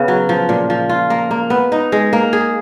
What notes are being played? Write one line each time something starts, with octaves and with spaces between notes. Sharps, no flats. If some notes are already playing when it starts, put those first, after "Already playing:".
Already playing: C#3 B3
F#3
F3
A#2
F3
F4
A#3
A#3
B3
D#4
G#3
A#3
G#4